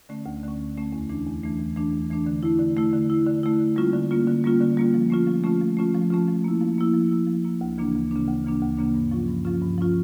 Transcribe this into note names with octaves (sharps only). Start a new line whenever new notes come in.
D3 A3 C#4
D2
D3 A3 C#4
D2
D3 A3 C#4
E2
E3 A3 D4
E2
E3 A3 D4
E2
E3 A3 D4
E2
E3 A3 D4
D3
A3 E4
D3
A3 E4
D3
A3 E4
D3
A3 E4
D3
G3 A#3 C#4 F4
D3
G3 A#3 C#4 F4
D3
G3 A#3 C#4 F4
D3
G3 A#3 C#4 F4
F3
A3 C#4 F4
F3
A3 C#4 F4
F3
A3 C#4 F4
F3
A3 C#4 F4
F3
A#3 E4
F3
A#3 E4
F3
A#3 E4
F3
A#3 E4
D2
C#3 E3 A#3 D4
D2
C#3 E3 A#3 D4
D2
C#3 E3 A#3 D4
D2
C#3 E3 A#3 D4
G2
F3 C#4 F4
G2
F3 C#4 F4
G2
F3 C#4 F4